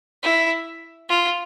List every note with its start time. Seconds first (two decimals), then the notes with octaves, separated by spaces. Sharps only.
0.22 E4
1.09 F4